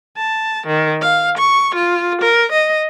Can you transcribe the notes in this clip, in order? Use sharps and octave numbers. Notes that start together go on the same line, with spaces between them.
A5
D#3
F5
C#6
F4
A#4
D#5